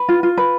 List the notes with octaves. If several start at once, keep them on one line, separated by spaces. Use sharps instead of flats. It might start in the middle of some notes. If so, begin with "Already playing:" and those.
Already playing: B4
F4
F4
B4